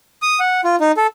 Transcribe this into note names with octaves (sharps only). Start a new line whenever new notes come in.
D#6
F#5
F4
D#4
A4